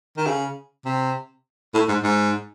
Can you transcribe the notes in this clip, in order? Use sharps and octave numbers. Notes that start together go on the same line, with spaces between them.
D#3
C#3
C3
A2
G#2
G#2